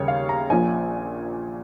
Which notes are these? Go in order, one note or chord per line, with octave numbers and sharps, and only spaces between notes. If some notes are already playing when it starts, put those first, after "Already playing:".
Already playing: D#2 C#3 G3 A#3 C#5
F5
A#5
A#1 A#2 F3 G#5